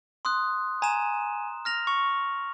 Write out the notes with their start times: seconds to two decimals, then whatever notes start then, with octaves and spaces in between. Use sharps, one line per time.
0.25 C6 D#6 F#6
0.82 G#5 A#5 E7
1.65 F6 A#6 F7
1.87 C#6